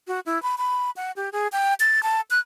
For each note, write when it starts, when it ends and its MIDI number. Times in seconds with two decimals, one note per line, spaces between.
0.08 0.20 66
0.26 0.41 64
0.43 0.56 83
0.58 0.91 83
0.96 1.12 78
1.16 1.29 67
1.33 1.48 68
1.52 1.74 79
1.80 2.03 93
2.03 2.21 81
2.31 2.39 90